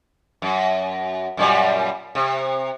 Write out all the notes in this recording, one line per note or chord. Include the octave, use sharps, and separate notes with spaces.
F#2
F#2 A#2 G3
C3